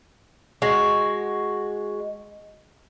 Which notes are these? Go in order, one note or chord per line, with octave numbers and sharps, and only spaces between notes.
G#3 F#4